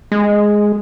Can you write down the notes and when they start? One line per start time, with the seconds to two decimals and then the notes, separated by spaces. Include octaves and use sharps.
0.12 G#3